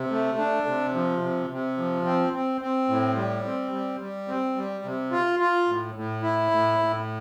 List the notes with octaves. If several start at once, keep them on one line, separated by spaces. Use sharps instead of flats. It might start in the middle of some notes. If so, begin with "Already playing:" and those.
Already playing: C3
A3
D4
C3
F3
C3
C3
F3
C4
C4
C4
A2
G3
C4
G3
G3
C4
G3
C3
F4
F4
A2
A2
E4
A2
A2